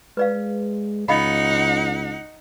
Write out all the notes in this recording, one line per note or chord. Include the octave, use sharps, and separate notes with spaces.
G#3 B4 D5 F5
C#2 D#4 D#5 F5 F#5 B5